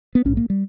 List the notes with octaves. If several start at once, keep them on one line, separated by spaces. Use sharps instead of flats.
B3
A#1 G#2 C#4
A#3
G3